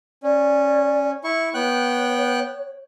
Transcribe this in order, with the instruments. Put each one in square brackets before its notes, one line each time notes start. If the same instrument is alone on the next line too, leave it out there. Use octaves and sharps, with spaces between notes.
[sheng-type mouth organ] C#4 [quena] D5
[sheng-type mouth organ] E4 C#6
[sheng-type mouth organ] B3 G5 F#6 [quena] C#5